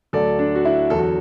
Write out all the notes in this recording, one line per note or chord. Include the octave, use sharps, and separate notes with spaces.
D2 D3 F#3 A4 D5
D4
F#4
E4
E2 D3 F#3 A4
F#4